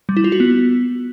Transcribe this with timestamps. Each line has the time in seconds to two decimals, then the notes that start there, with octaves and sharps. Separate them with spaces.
0.09 G3
0.17 E4
0.24 F4
0.32 F#4
0.40 B3